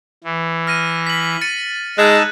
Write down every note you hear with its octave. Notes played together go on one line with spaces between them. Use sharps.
E3
F6 A#6 D#7
B6 F#7
A6 C#7 D#7
G#3 D#4 A5 E6 F#6 G#6